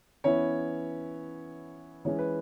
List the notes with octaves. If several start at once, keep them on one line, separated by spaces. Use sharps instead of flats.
E3 B3 C#4 E4 C#5
E3 G#3 C#4 C#5
B4